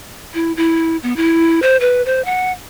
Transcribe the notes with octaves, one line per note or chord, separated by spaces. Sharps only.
E4
E4
B3
E4
C5
B4
C5
F#5